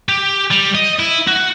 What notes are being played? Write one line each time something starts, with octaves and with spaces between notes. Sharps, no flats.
G4
G3
D#5
E4
F#4